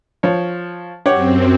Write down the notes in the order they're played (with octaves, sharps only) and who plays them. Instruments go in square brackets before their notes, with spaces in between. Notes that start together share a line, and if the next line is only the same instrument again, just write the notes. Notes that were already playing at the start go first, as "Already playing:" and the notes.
[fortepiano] F3 C#5
[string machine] F#2 C4 [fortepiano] G4 C#5 F#5